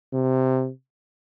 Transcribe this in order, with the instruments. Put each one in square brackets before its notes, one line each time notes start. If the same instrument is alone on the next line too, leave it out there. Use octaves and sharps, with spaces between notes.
[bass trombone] C3